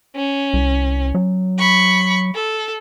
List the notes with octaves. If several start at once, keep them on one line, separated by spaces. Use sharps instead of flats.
C#4
C2
F#3
B5 C#6
A4